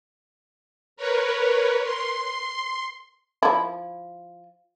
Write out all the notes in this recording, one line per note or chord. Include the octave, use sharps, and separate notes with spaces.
A#4 B4 C#5
C6
F3 E4